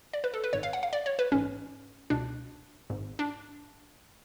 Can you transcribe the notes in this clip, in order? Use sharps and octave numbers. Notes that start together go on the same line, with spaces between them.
D5
B4
A4
B4
G#1 G#2 C#5
F5
F#5
F5
D5
C#5
B4
A1 G#2 C#4
C#2 B2 D4
G#1 G#2
D4